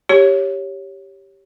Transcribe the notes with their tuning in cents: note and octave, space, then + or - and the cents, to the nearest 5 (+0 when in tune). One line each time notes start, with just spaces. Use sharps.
G4 +0 C#5 -5